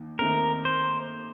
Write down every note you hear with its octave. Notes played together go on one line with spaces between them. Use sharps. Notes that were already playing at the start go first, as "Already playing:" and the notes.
Already playing: D#2 D#3
D#2 D#3 A3 C4 A#4
C5